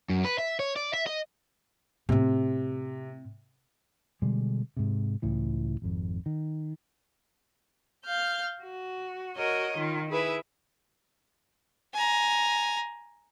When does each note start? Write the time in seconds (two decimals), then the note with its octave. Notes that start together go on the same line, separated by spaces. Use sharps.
0.09 F#2
0.25 B4
0.38 E5
0.60 C#5
0.76 D5
0.94 E5
1.07 D#5
2.09 A2 C3 C4
4.22 B2 D3 G3 G#3
4.77 G#2 C3
5.22 C#2 A2 E3
5.82 G#1 F2
6.26 D#3
8.05 F5 F6 G6
8.63 F#4
9.37 F#4 A#4 C#5 D#5
9.77 D#3 F4
10.09 E4 G#4 B4 E5
11.94 G#5 A#5